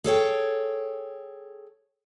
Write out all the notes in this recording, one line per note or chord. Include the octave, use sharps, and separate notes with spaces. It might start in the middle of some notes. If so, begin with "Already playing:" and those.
G#4 A4 C#5 G5